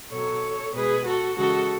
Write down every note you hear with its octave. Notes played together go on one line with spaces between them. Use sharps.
B2 F#3 A4 C#5
B2 G#3 G#4 B4
F#4 A4
C#3 E3 G#3 F#4 A4